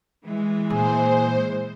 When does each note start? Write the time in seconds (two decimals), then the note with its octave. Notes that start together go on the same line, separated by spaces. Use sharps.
0.25 E3 G#3
0.70 A#2 G#4 C5